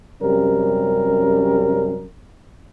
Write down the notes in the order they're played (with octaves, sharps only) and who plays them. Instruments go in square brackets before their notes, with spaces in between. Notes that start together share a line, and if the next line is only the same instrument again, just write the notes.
[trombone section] F#2 C3 G3 C#4 A#4